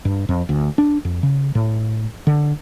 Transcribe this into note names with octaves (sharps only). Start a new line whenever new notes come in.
G2
F2
D2
D4
F2
C#3
A2
D3